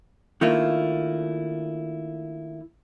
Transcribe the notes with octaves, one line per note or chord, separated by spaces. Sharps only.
D#3 A3 A#3 D4 E4 F4